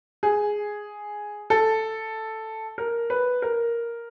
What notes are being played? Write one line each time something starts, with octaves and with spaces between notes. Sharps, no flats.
G#4
A4
A#4
B4
A#4